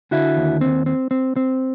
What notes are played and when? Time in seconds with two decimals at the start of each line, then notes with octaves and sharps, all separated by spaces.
0.11 D3 E4 F#4
0.37 D#2
0.61 C4
0.86 C4
1.11 C4
1.36 C4